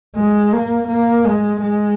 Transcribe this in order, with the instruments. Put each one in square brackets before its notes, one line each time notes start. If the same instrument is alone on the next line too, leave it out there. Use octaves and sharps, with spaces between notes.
[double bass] G#3
A#3
A#3
G#3
G#3